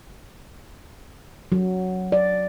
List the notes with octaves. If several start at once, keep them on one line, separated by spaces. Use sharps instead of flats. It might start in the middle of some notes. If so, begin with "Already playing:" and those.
F#3
D5